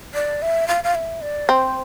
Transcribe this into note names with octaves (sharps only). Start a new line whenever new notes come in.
D5
E5
F5
F5
E5
D5
C4 C5